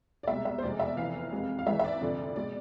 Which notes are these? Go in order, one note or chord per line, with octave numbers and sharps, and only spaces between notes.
D5
C2 B2 G#3 E5
E5
C5
F1 E2 B2 G#3 D5
E5
F1 F2 E3 F5
F2 C3 G#3
F5
G#1 G#2 E3 G#3 E5
E5
D5
F1 F2 D3 F3
B2 G#3 D5